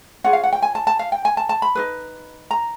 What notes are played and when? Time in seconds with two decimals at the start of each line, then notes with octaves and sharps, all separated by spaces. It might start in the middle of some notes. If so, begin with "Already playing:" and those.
0.24 C#4 F4 G#4 F#5
0.33 F5
0.43 F#5
0.53 G5
0.62 G#5
0.75 A5
0.87 A5
0.99 F5
1.12 G5
1.25 G#5
1.37 A5
1.49 A5
1.62 B5
1.75 D#4 G#4 B4
2.51 A#5